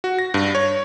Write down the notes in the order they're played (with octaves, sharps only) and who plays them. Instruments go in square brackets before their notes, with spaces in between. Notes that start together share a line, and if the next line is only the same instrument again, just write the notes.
[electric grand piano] F#4
A#6
G2
C#5